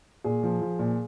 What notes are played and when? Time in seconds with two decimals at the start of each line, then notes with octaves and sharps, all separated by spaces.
0.24 A#2 G#4
0.43 F3
0.61 F3
0.79 A#2